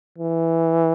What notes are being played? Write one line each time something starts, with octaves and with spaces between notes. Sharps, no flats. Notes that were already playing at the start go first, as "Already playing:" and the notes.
E3